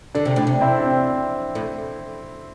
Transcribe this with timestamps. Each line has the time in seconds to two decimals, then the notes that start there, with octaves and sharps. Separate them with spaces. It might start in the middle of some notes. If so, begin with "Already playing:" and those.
0.15 D3 D4
0.25 C3
0.36 A2 D4
0.47 C3
0.61 C4 E4
0.78 D4
0.85 C4
1.55 A2